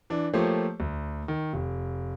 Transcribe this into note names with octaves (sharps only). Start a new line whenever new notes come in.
E3 D4
F3 A3 A#3 G4 C5 C#5
D2
D#3
F1